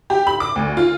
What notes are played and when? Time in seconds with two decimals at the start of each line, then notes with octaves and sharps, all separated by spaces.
0.10 G4
0.27 B5
0.40 D6
0.56 D2
0.77 F4